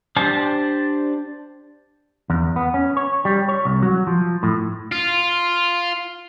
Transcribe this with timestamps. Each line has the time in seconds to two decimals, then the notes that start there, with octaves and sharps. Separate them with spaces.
0.16 D4 G4 C5 A5
2.30 E2
2.56 B3
2.74 C#4
2.97 C#5
3.25 G3
3.49 C#5
3.65 C2
3.83 F#3
4.07 F3
4.43 A2
4.92 F4